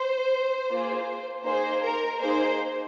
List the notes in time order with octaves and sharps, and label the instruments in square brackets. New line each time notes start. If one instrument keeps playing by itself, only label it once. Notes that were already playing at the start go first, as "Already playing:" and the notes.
Already playing: [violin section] C5
A#3 F4 G#4
A#3 D#4 G#4 C5
A#4
A#3 D#4 G#4 C5